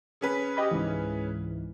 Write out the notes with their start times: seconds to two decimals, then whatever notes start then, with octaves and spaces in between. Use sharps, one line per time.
0.21 C#3 C#4 B4
0.57 G4 D#5 B5
0.71 C#2 G#2 E3